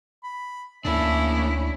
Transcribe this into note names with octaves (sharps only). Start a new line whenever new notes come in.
B5
D2 A#3 C#4 D4 E4 E5